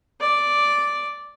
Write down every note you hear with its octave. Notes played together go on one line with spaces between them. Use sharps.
D5